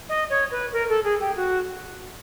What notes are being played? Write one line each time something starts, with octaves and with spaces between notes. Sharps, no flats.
D#5
C#5
B4
A#4
A4
G#4
G4
F#4